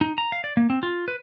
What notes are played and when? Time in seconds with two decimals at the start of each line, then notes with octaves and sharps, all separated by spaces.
0.01 D#4
0.18 A#5
0.32 F5
0.44 D5
0.57 A#3
0.70 C4
0.83 F4
1.08 B4